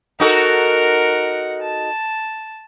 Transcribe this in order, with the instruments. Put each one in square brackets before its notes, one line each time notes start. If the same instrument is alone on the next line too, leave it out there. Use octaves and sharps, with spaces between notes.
[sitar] D#4 F#4 A4 [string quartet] A#4 F#5
[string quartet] A5